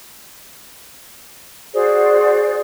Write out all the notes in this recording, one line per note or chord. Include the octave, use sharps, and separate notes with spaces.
F#4 G#4 C5 D5